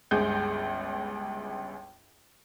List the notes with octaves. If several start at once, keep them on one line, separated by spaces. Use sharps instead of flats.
G1 C#2 G#3 G6